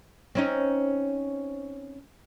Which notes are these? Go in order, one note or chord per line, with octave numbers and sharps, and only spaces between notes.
C4 C#4 D#4